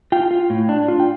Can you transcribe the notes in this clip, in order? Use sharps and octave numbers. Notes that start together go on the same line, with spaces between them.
F4 G5
F4
A2
D4
F4
G5